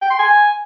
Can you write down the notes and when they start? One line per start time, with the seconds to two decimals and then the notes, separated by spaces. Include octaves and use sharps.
0.02 G5
0.10 C6
0.19 G#5